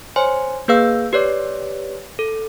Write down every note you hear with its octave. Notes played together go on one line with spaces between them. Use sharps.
C5 C#5 G#5 C6
A#3 G#4 B4 F5 E6 G6
G4 B4 C#5 D5 D6
A4